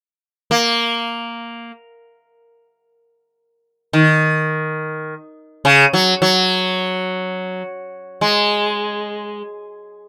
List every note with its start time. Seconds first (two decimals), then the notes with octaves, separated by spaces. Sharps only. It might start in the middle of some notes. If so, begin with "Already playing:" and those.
0.51 A#3
3.93 D#3
5.65 C#3
5.93 F#3
6.22 F#3
8.21 G#3